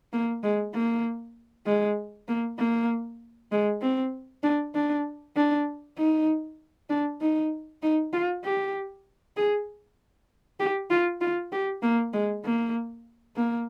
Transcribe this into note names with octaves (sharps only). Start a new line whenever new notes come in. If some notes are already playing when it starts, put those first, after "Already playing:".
A#3
G#3
A#3
G#3
A#3
A#3
G#3
C4
D4
D4
D4
D#4
D4
D#4
D#4
F4
G4
G#4
G4
F4
F4
G4
A#3
G#3
A#3
A#3